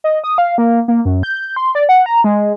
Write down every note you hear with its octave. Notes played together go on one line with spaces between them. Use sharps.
D#5
D#6
F5
A#3
A#3
F#2
G6
C6
D5
F#5
A#5
G#3